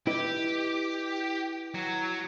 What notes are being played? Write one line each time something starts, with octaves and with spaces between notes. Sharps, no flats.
E4 G4 B4 D#5
F#3